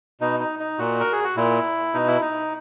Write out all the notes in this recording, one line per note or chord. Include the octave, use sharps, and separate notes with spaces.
B2 D#4
D#4
D#4
A#2 F#4
A#4
G#4
F#4
A#2 E4
B2 D#4
E4
D#4